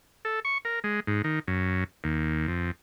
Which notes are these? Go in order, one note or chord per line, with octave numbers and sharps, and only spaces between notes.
A4
C#6
A#4
G#3
G#2
D#3
F#2
D#2
F2